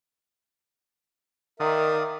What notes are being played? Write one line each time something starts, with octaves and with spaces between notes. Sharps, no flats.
D#3 A#4 D5 E5 F5 D#6